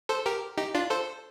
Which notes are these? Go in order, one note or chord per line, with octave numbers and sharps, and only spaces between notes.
A4 C5
G4 A#4
D#4 G4
D4 F4
A4 C5